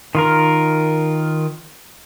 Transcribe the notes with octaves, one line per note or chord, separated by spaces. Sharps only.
D#3 F4 A#4